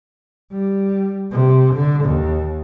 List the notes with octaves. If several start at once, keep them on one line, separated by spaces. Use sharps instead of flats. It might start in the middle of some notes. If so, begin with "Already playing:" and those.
G3
C3
D3
D#2